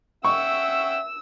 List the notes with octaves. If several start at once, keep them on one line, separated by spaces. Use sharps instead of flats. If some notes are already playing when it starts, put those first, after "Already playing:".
C#4 E5 F#5 G5 C#6 E6